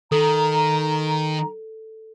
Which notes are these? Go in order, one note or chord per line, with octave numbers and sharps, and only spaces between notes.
D#3 A4 A#5